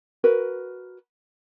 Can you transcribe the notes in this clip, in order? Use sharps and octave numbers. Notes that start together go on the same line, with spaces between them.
F#4 A#4 B4